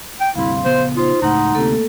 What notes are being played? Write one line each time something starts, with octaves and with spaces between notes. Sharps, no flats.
G5
D2 G2 C3 E4 F5 C6
A#1 C#3 B3 C5
D#4 F4 C5
C#2 A2 D#4 F#5 C6 D#6
D2 C3 A3 A#3 A4